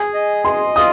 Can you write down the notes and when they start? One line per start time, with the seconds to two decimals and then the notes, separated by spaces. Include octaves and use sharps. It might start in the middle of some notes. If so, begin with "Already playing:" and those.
Already playing: G#4 G#5
0.14 D#5
0.45 D#5 C6
0.76 F4 D#6